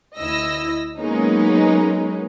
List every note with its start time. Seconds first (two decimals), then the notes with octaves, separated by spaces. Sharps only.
0.17 D2 E4 D#5 E6 A#6
1.00 F#3 G#3 A#3 B3 C#4 D#4